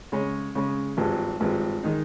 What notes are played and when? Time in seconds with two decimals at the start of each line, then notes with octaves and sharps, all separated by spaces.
0.12 C#3 G#3 C#4
0.55 C#3 G#3 C#4
0.97 G#1 G2 F3 G#3
1.40 G#1 G2 F3 G#3
1.83 D#3 G#3 D#4